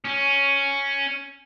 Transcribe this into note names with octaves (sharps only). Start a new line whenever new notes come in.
C#4